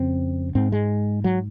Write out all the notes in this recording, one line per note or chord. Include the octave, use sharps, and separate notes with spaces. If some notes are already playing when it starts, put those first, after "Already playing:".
Already playing: F2 C#3 C4
G#2 C4
G#3
F#3